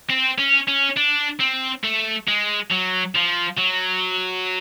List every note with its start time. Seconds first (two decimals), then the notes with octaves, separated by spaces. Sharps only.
0.10 C4
0.39 C#4
0.68 C#4
0.97 D4
1.40 C4
1.84 A3
2.28 G#3
2.71 F#3
3.15 F3
3.57 F#3